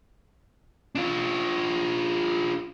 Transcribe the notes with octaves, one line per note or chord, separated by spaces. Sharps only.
D4 F4